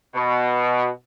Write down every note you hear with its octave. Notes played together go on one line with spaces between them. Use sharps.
B2